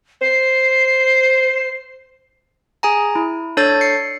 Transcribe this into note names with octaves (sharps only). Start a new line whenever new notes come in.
C5 C7
G#4 G#5 A#5
E4
D4 A4 C#5 G6 A6
C7 C#7